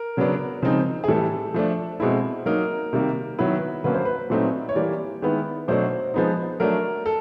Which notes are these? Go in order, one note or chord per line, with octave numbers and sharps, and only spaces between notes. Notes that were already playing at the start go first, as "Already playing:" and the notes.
Already playing: A#4
C#3 F#3 B3 D4
C#3 F3 G#3 C4 D#4
G#4
A2 E3 G3 A4
F3 A3 D4
B2 G#3 C4 E4
F#3 A#3 D#4 A#4
C3 D#3 G3 A#3
D#3 F#3 B3 E4 B4
D3 F#3 A#3 C#4 B4
C5
B4
A#2 F#3 A3 C4 D#4
C#5
E3 G3 A#3 D5
D#3 G#3 B3 E4
B2 F#3 A3 D4 C5
F3 G#3 B3 D#4
F#3 A3 D4 A#4
A4